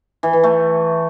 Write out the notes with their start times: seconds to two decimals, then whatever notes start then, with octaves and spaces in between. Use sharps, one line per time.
0.23 E3
0.33 E3
0.43 A3